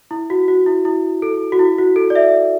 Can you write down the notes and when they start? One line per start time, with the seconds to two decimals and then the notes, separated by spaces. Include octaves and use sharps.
0.11 E4
0.30 F#4
0.48 F#4
0.66 E4
0.85 E4
1.22 A4
1.52 F#4
1.59 E4
1.78 F#4
1.96 A4
2.10 D5
2.15 E5